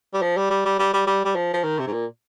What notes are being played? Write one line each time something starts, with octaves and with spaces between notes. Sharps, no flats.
G3
F3
G3
G3
G3
G3
G3
G3
G3
F3
F3
D#3
C3
G#2
A#2